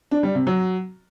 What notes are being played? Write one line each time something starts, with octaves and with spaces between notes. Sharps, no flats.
D4
G3
C3
F#3